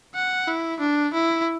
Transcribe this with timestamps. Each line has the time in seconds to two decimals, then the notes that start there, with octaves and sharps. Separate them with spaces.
0.15 F#5
0.48 E4
0.80 D4
1.14 E4